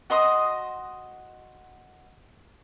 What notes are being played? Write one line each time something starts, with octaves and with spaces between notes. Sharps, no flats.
F#4 D#5 C6 D#6